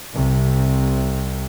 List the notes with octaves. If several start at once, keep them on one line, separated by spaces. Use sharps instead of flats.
C2 C3